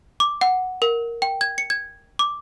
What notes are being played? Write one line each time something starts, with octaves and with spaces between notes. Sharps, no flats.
D6
F#5
A#4
G5
G#6
C#7
G#6
D6